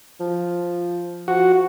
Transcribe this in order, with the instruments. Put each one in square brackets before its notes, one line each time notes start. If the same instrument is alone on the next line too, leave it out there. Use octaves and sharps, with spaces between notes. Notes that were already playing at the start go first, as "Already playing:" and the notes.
[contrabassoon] F3
[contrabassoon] F3 [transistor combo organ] F#4